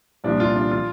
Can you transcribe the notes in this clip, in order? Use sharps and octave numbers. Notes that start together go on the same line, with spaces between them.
C2 A#2 F3 D4
F4
D4
F3 F4